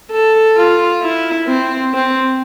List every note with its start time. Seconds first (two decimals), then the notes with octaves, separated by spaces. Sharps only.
0.11 A4
0.57 F4
1.02 E4
1.48 C4
1.94 C4